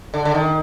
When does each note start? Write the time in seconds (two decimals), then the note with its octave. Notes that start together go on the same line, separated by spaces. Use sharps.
0.14 D3
0.25 D3
0.35 D#3